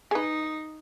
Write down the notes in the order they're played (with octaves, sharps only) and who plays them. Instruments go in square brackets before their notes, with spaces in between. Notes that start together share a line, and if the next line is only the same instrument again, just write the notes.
[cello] D#4 [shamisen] G#4 B4